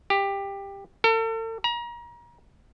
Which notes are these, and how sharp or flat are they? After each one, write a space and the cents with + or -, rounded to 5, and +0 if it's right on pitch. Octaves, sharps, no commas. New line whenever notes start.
G4 +15
A4 +40
A#5 +30